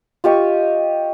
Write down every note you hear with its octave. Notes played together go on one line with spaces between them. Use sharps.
F4 G4 D#5 C#6